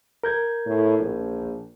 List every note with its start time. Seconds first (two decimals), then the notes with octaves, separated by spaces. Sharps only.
0.24 A#4 G6 G#6
0.66 A2
0.99 A#1